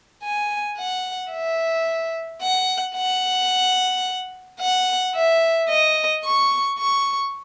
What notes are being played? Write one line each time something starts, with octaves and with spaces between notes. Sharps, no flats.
G#5
F#5
E5
F#5
F#5
F#5
E5
D#5
C#6
C#6